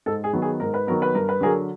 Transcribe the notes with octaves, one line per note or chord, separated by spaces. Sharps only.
G#2 A4
G#4
D#3 F#3 B3
G#4
G#2 A#4
B4
D#3 F#3 B3 A#4
B4
G2 A#4
B4
D3 F#3 G#4 A#4